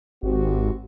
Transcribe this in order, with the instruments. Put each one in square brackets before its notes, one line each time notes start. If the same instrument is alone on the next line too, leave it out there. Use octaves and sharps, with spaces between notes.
[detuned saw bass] G#1 [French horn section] C4 F#4 G4